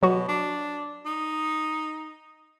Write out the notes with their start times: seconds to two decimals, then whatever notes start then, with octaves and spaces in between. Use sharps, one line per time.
0.03 B2 F#3 F#4
0.28 D4
1.06 D#4